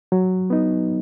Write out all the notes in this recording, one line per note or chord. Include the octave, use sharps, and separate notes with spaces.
F#3
B3 D#4